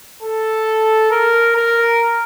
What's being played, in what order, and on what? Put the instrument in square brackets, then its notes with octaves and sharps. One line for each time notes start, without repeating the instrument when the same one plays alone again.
[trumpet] A4
A#4
A#4